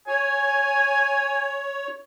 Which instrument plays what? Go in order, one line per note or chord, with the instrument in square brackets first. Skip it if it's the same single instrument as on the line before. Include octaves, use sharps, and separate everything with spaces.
[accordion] C#5 [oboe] G#5